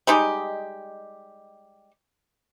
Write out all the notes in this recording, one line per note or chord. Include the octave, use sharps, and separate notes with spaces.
G3 G#3 D#4 G4